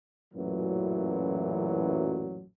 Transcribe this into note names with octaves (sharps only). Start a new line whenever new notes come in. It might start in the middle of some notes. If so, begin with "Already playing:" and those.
A1 F#2 A#2 E3 F#3